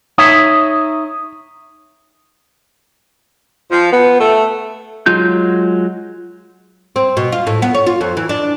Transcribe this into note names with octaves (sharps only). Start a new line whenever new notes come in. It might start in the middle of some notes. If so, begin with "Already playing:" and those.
D#4 C#5 E5 D#6
F3
B3
A3
F#3 G#3 F4 G6
C4
B2
F4
A2
B3
C#5
F4
F2
E3
D4